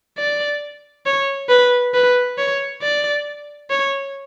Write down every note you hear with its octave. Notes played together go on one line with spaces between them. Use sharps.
D5
C#5
B4
B4
C#5
D5
C#5